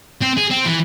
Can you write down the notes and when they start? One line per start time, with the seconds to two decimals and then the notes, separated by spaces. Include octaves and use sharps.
0.22 C4
0.38 G#4
0.51 C4
0.66 E3